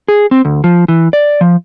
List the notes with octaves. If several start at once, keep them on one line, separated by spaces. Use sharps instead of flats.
G#4
C4
D2
F3
E3
D5
F3